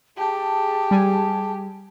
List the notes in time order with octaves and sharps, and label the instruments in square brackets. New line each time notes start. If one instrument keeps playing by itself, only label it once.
[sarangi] G4 [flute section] G#4 A5
[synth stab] G3 G#5